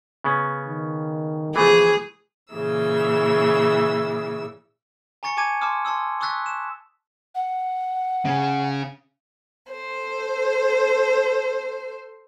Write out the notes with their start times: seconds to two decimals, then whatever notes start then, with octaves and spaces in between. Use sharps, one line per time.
0.24 C#3 B3 C#4
0.66 D#3
1.56 E3 F3 A3 G#4
2.54 A#2 C#3 E3 E6
5.23 G#5 A#5 C#6 A6 C#7
5.37 G#5 A5 D6 G#6 A6 D#7
5.61 A5 C6 D6 D#6 F6
5.85 A5 C6 D#6 E6
6.21 C#6 D#6 E6 F#6 A6 B6
6.46 E7
7.35 F#5
8.25 C#3 C#4
9.71 A4 C5